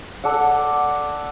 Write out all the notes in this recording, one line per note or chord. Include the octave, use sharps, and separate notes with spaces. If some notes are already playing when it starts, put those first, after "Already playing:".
A4 D5 F#5